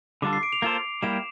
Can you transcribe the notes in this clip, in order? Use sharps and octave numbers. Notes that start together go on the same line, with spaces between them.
D3 G3 D4 F4 A4 D6
C7
D7
F7
A#3 F4 A4 C5
G3 A#3 E4 G4 E7